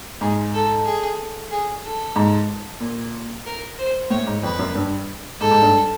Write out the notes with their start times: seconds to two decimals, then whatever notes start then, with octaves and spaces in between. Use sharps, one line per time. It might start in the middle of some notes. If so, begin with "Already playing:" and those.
0.21 G#2 G#4
0.54 A4
0.85 G#4
1.51 G#4
1.83 A4
2.16 G#2
2.80 A#2
3.46 A#4
3.78 C5
4.10 A2 C#5
4.27 G#2
4.42 F2 B4
4.59 F#2
4.75 G2
5.41 G#2 A4
5.51 G#2
5.62 G2